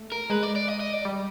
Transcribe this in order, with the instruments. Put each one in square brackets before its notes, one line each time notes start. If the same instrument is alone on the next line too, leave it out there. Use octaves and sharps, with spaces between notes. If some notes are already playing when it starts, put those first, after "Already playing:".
Already playing: [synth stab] A3
[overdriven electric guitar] A#4
[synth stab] G#3 [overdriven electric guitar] B4
[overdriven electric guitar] D5
D5
D#5
D#5
D5
[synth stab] G3